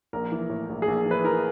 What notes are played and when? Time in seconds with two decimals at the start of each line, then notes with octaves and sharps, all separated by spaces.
0.13 A#1 A#4
0.32 E3
0.49 A2
0.69 A#1
0.82 G#4
0.88 A#1
1.05 E3
1.11 B4
1.24 E3 A#4